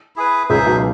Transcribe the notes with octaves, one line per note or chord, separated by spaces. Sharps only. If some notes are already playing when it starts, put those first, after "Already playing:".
E4 G#4 B4
C#2 C#3 D#4 G#4 C5 E5
B1 B2